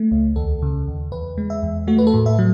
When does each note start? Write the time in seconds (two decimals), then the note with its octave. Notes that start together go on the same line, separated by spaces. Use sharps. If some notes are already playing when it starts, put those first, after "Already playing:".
Already playing: A3
0.11 C#2
0.36 D#2 A4
0.62 C#3
0.88 D#2
1.12 E2 B4
1.38 G#3
1.50 E5
1.63 E2
1.87 A3 F#4
1.98 B4
2.07 A4
2.14 A2
2.26 E5
2.39 F#3